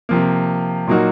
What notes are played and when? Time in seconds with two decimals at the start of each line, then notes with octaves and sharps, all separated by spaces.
0.09 C3 F3 A#3
0.87 A#2 F#3 A#3 D#4 F#4